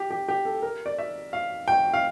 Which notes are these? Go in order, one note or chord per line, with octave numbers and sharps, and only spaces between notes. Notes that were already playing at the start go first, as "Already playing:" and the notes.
Already playing: G4
G4
G4
A4
A#4
D5
E5
F5
G5
F5